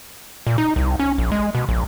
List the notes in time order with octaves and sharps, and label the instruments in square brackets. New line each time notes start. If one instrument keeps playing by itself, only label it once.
[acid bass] A#2
D#4
C2
C#4
A#1
G#3
B2
A#1